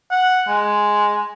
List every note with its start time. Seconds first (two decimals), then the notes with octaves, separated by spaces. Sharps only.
0.11 F#5
0.48 G#3